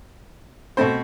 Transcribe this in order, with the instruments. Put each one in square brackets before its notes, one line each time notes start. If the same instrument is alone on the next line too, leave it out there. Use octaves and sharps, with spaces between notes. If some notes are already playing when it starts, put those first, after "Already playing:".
[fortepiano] B2 A3 C4 C5